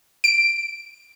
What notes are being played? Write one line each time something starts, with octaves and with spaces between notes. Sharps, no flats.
D7